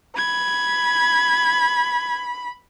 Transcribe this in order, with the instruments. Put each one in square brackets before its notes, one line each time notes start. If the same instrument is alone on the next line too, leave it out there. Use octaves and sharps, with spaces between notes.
[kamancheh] B5 [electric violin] G#6